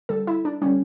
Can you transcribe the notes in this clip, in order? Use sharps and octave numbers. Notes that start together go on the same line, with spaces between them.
D3 G3 A4
E4
D4
D3 G3 C#4